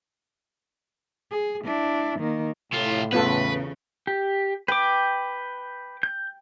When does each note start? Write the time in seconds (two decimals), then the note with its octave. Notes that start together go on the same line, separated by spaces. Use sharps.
1.31 G#4
1.64 D4 E4
2.20 D#3 A#3
2.73 A2 C3 F4
3.13 E2 C#3 B3 F4 A4 B4
4.07 G4
4.68 B4 G5 D6
6.03 G6